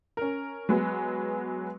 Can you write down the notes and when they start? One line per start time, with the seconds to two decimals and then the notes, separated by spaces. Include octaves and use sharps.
0.17 C#4 A#4
0.69 F#3 G#3 B3